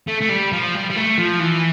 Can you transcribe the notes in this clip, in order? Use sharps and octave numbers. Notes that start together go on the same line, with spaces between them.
A3
A3
G3
F3
G3
G3
A3
F3
E3